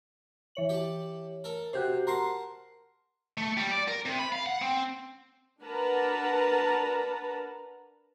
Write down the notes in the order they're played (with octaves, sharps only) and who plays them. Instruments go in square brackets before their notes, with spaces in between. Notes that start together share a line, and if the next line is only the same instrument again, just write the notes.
[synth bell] E3 C#5 F#7
[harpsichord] G4 A5
A4 A#4
[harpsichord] C3 [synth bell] F#4 G4 C5
[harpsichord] A#4 F#5 A5 [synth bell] A#5 C6 C7
[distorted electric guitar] A3
G3
D5
A#4
C3
B5
F5
F#5
C4
[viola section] D4 A#4 B4 F#5 A5 A#5